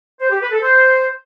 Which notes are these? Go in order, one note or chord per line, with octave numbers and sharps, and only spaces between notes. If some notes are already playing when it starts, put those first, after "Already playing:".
C5
G4
B4
A4
C5